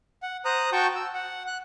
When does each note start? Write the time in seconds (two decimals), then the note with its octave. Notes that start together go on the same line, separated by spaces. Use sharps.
0.23 F#5
0.45 C5 A#5 D#6 F#6
0.72 F#4 G5 A5 C#6 G6
0.96 E6
1.15 F#5
1.47 F#6